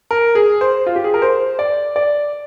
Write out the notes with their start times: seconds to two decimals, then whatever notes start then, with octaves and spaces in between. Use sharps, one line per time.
0.11 A#4
0.35 G#4
0.61 C5
0.86 F4
0.96 G4
1.04 G#4
1.14 A#4
1.22 C5
1.59 D5
1.96 D5